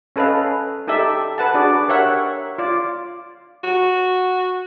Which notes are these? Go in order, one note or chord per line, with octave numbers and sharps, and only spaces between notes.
C#4 A4 B4 D#5 F5
D#4 G4 A4 D5 E5
B4 F#5 A5
D4 F#4 G#4 D5
G4 A#4 C#5 E5 F#5
F4 D5
F#4